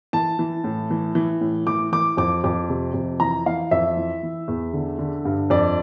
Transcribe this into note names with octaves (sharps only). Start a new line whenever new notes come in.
E3 A5
E3
A2
E3
E3
A2
E3 D6
E3 D6
F2 D6
F2 D6
C3
F2
E3 A#5
E3 F5
F2 E5
E3
E3
E2
D3
D3
G2
F2 D5